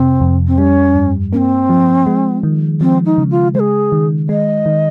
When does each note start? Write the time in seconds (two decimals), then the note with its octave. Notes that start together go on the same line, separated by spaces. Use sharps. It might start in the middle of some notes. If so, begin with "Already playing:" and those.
Already playing: F2 C3 C4
0.21 F2
0.47 C4
0.58 G3 C#4
0.95 G2
1.33 A#3 C#4
1.37 C4
1.69 F3
2.06 G#3
2.43 D#3
2.81 F3 C4
3.05 D#4
3.18 C#3
3.31 F4
3.54 G#3 G#4 C5
3.92 D#3
4.29 G#3 D#5
4.66 D#3